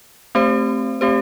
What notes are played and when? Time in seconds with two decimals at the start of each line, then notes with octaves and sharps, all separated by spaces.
0.35 A3 C4 G4 C5
1.01 A3 C4 G4 C5